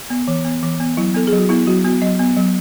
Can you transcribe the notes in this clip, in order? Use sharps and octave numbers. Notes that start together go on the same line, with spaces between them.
B3
E3
B3
E3
B3
F#3 E4
B3 A4
G#4
F#3
F#4
B3 E4
F#3 F#4
B3 F#4
F#3 D#5
B3
F#3